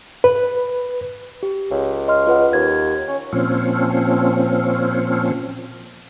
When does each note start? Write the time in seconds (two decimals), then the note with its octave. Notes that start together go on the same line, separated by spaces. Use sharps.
0.24 B4
1.43 G4
1.71 C#2
2.08 D#5 C6 F6
2.27 F4 B4 F#5
2.53 D#2 G#6
3.09 C#4
3.33 A#2 F3 C4 C#4